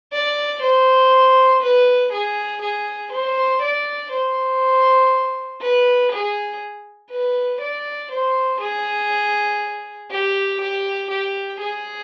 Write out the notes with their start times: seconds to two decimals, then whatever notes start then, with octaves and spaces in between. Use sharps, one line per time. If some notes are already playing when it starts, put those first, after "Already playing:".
0.13 D5
0.63 C5
1.62 B4
2.13 G#4
2.62 G#4
3.12 C5
3.62 D5
4.12 C5
5.61 B4
6.12 G#4
7.11 B4
7.61 D5
8.12 C5
8.61 G#4
10.11 G4
10.61 G4
11.11 G4
11.61 G#4